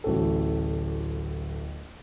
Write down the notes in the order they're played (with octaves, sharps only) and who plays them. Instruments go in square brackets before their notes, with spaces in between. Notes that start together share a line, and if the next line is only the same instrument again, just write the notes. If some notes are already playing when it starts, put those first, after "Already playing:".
[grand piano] D1 A1 F#4 A4